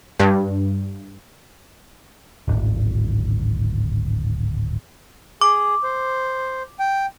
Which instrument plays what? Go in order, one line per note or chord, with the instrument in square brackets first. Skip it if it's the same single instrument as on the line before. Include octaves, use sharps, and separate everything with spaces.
[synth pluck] G2
[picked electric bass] D1 G#1
[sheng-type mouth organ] G#4 [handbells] D6
[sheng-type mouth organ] C5
G5